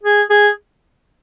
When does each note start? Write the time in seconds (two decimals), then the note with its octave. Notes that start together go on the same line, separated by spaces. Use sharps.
0.03 G#4
0.30 G#4